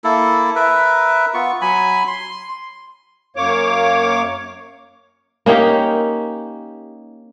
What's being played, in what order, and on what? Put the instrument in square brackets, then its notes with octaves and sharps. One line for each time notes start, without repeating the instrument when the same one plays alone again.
[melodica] A#3 E4 A4
A#4 B4 E5
B3 F4 C#6
F#3 G#5 B5
C6
[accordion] F#2 A#3 C#5 D6
[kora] A#3 C#4 D#4 G4